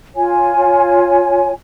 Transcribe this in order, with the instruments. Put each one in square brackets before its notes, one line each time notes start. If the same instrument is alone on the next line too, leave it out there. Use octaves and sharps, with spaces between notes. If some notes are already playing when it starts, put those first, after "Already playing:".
[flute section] F4 C#5 G#5